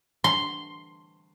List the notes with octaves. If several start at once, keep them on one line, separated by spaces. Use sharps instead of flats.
C6